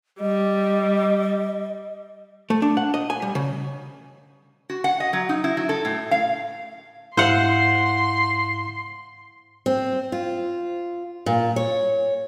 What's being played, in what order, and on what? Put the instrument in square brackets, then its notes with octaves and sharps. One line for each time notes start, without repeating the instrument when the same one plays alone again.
[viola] G3 [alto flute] D#5
[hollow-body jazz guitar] A3
D4
F#5
D#5
G#5
G3
C#3
[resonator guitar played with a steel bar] F#4
F#5
D#5
F#3
D#4
E4
F#3
A4
A2
F5
[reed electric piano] G#2 E4 F5 [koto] C5 F#5 [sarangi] C6
[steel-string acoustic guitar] C4
F4
A#2
C#5